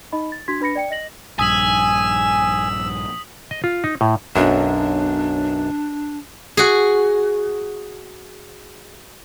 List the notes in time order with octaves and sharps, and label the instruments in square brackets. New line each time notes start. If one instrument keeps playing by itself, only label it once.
[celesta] D#4 D#5 B5
A6
D4 F#4 C6 G#6 B6
D4 B4 B5 A#6 C#7
D5 G5 C#7
D#5 A#6 F#7
[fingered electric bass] A#1 G2 [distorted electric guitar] G#5 [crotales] D#6 B6 F#7 [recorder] E6
[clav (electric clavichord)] D#5
F4
D#4
A2
[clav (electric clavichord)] B1 F#2 [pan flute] D4
[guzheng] F#4 G#4